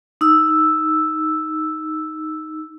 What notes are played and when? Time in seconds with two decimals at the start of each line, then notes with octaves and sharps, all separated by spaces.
0.21 D#4 E6